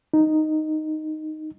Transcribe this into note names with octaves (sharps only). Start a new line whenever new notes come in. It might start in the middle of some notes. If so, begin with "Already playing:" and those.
D#4